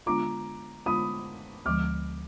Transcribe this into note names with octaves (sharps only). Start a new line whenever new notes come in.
D3 G#3 B3 D4 F4 A#5 D6
D3 G#3 B3 D4 F4 B5 D#6
D2 D3 F3 G#3 D6 F6